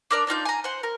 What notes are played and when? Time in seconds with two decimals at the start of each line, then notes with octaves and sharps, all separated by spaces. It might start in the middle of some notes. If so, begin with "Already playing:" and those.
0.11 D4 A#4 D5
0.27 D4 D#4 F4 G6
0.45 G#5 A#5
0.64 C5 F#5
0.83 A#4